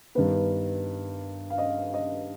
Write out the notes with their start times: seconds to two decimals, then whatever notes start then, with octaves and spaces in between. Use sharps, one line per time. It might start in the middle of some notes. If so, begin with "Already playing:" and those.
0.15 G2 D#3 B3 B4
1.50 F5
1.58 D#5
1.94 D#5